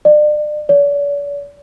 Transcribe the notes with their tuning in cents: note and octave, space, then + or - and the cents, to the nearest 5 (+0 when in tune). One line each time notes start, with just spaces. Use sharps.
D5 +35
D5 -45